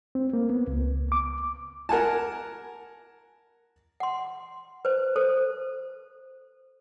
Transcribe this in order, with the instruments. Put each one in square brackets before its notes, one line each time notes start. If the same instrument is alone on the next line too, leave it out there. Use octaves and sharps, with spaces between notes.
[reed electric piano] C4
A#3
B3
C#2
D6
[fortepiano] A#4 F#5 G#5 A5
[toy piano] F#5 C6
B4 C5
A4 C5